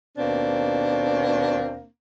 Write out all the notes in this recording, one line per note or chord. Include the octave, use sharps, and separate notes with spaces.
D#2 B2 A#3 C4 D4